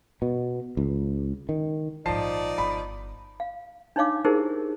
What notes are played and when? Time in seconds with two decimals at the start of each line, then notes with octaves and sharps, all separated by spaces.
0.22 B2
0.77 C#2
1.49 D#3
2.06 A#1 G#2 F3 D#4 D5 A5 C7
2.58 G1 B5
3.40 F5
3.96 D4 D#4 C#5 F5 D6
4.25 D#4 E4 G4 G#4 A#4 C5